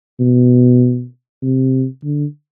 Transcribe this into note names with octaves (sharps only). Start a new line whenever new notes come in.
B2
C3
D3